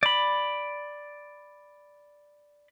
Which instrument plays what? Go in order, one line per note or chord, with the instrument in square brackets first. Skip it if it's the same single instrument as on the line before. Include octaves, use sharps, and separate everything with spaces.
[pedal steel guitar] D5 B5